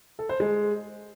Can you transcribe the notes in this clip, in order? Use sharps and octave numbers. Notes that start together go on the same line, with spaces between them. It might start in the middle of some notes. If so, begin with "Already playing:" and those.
A4
C5
G#3